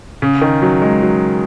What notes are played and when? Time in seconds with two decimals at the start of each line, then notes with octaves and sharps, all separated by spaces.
0.22 C#3
0.41 D#3
0.62 F#3
0.82 G#3
1.02 F#3